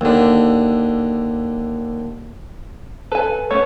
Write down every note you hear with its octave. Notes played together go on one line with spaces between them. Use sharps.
D#2 D3
A4 B4 G#5
A3 B3 C#4 C#5